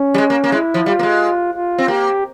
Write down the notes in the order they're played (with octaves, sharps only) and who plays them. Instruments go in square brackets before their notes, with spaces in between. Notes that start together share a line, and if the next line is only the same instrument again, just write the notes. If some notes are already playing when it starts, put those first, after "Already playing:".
Already playing: [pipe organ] C#4
[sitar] G3
G#3
A#3
A#3
[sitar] G#3 [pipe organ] E4
[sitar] F3
[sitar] G3 [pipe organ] F4
[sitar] A#3
G#3
[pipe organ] F4
[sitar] C4
[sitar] A#3 [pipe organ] G4